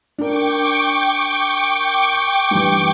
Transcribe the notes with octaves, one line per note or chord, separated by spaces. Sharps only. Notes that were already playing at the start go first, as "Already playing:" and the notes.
D4 A#4 G5 C#6 D6
G2 E3